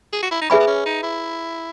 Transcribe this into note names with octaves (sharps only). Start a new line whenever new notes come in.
G#4
F#4
E4
D#4
C#4 G#4 B4 E5 G#5 B5
B3
C#4
D#4
E4